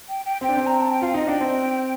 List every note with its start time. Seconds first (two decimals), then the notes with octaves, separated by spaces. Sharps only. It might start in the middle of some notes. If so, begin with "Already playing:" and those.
0.09 G5
0.25 G5
0.41 C4 G5
0.49 D4
0.57 C4
0.66 A#5
0.81 A5
0.91 G5
1.02 F4 F5
1.14 D#4 D#5
1.27 D4 G5
1.41 C4